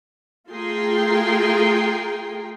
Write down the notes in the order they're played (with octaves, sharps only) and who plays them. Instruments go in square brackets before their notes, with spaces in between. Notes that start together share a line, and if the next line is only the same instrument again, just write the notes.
[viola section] A3 F4 G#4 G5 A#5 C6